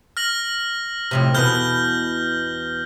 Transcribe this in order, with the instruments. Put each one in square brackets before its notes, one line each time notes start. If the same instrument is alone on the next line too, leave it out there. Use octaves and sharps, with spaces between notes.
[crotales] F6 A#6 F#7
[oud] F2 A2 C3
[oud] E2 B2 B4 [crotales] F6 G6 G7